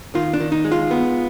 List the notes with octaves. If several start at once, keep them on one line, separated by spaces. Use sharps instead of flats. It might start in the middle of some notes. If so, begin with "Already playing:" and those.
D#3 F4
D4
D#3
D#4
G#3
F4
B3